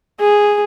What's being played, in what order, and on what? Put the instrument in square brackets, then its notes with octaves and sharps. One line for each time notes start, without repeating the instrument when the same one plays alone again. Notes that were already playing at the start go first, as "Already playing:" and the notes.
[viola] G#4